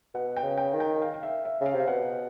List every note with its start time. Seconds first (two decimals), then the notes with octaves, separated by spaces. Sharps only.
0.14 B2 F#5
0.36 G5
0.43 C#3
0.58 G5
0.73 D#3
0.80 G5
1.02 F5
1.14 F5
1.23 E5
1.45 E5
1.61 C#3
1.66 F5
1.74 C3
1.80 F5
1.87 B2 F#5